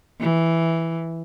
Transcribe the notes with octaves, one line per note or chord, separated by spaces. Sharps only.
E3